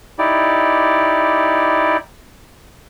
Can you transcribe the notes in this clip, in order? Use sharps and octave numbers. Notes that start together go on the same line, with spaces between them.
D#4 E4 G4 D5